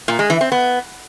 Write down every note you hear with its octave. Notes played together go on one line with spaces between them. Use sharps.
A#2
G#3
E3
C4
B3